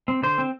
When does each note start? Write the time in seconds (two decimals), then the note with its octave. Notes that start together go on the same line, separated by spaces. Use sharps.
0.08 C4
0.23 D3 C5
0.38 C4